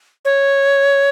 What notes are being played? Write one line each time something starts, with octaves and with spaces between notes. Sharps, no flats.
C#5